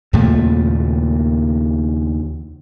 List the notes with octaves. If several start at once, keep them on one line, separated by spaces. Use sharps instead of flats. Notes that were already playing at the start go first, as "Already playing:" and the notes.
D#2 A#2 C#3 A3